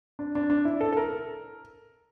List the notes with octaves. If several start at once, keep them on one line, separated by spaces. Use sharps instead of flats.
D4
D4
D4
E4
A4
A4
A#4